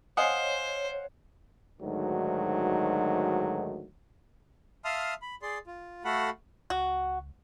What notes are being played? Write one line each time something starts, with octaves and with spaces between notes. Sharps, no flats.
C5 C#5 D#5 F5 F#5 G#5 D#6
D2 G#2 D#3 F#3
E5 F5 A5 C6 D#6 F6
B5
G#4 D5 C6
F4
A3 F#4 A4 F5 F#5 B5
C#2 F#4